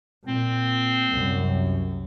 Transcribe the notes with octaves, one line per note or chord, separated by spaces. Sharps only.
A#2 C4
C2 F#2